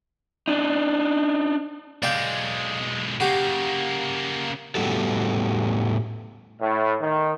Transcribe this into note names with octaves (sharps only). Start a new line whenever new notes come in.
D4 D#4
B1 G#3 D5 F5 G5
C#3 A#3 F#4 G4
A2 G3 B3 F#4 G4 A4
A2
D#3